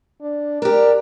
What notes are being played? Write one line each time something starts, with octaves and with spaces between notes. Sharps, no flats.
D4
D4 G4 A#4